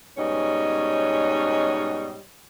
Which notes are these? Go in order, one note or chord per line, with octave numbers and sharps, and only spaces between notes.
G#2 B2 G3 C#4 C#5 D#5